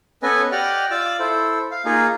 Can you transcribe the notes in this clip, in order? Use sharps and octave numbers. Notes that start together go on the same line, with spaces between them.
B3 C#4 A4 B4 D#5 G#5
G4 D5 D#5 F#5 G5 F6
F4 D5 D6 E6
E4 A4 C5
F5
A#3 D#4 F4 G#4